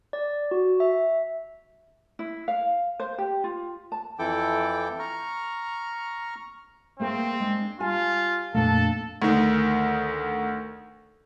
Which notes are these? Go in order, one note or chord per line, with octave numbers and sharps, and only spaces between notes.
D5
F#4
E5
E4
F5
C5
G4
F4
A5
F2 E3 E4 A4 G5 D6
A#5 C#6 F6
A3 A#3 C4 G#4
G#3 D4
G3 F4 G#5 A5
F2 A#2 A3 A#3 D4 A4 A5
D2 D#3